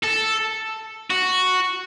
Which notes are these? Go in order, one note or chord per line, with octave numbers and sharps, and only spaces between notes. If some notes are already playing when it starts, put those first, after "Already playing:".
A4
F#4